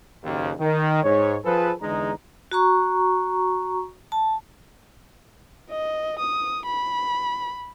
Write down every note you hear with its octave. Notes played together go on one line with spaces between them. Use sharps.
F#1 D#2
D#3
G#2 C#5
F3 G#4 A4 B4
E2 D3 G#3 D#4 A#5
F#4 A#5 C#6
A5
D#5
D#6
B5